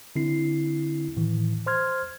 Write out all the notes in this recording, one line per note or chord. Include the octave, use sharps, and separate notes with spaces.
D3 C4 E4 C7
A2 D#3 E3
C5 C6 F6 G#6